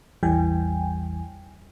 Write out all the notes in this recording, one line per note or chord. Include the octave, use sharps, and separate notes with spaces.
A1 E2 E3 G3 G5 G#5